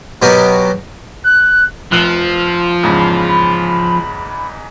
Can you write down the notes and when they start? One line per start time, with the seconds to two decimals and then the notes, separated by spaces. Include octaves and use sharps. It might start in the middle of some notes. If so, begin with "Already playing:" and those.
0.22 B2 F#3 B3 G4 A#4
1.24 F#6
1.92 F1 F3 F#6 F#7
2.83 E2 G#2 C#3 B5